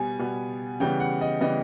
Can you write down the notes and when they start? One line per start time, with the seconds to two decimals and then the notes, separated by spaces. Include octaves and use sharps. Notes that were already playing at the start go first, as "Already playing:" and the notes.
Already playing: B2 G3 B3 G#5
0.19 B2 G3 B3
0.80 C#3 E3 G3 B3 G5
1.00 F#5
1.21 D#5
1.41 C#3 E3 G3 B3 D#5